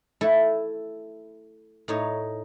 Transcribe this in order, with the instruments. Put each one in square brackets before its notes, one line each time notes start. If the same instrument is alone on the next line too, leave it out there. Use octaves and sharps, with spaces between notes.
[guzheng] A3 E4 A4
A2 D#4 C#5